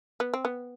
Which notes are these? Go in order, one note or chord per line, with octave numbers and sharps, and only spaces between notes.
B3
C4
B3